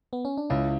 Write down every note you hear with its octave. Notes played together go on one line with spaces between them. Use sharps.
B3
C#4
D4
C#2 C#4 E4